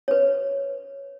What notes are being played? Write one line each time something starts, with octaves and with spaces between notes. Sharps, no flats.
B4 C#5